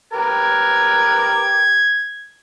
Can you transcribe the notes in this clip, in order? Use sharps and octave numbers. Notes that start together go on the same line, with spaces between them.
G4 A#4 B4 G#6